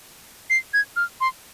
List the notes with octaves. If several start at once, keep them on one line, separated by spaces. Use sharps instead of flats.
C7
G#6
F6
C6